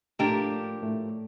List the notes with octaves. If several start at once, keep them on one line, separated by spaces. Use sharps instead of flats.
A2 F3 A3 A#3 D4 G4
A2 A3